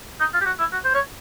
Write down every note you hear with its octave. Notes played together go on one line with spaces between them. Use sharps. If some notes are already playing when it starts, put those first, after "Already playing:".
D#4
F4
G4
F#4
E4
F#4
C5
C#5